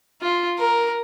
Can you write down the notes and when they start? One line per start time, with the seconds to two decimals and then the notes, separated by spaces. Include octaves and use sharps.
0.21 F4
0.59 A#4